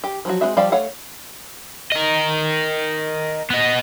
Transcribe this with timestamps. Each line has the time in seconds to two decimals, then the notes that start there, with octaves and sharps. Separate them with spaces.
0.04 G4
0.25 F3 F#3 F#4
0.41 G#3 C4 F#4 E5
0.57 F3 G3 G4 D5 F5
0.72 A3 C#5 F5 F#5
1.92 A#4 D#5
3.50 B3 D#5